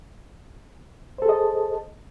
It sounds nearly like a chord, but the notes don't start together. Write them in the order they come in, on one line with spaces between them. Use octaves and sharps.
C5 A4 G#4 D#5 A5